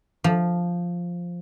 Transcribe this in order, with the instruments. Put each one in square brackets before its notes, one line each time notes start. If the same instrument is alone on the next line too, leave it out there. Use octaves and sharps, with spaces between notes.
[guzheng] F3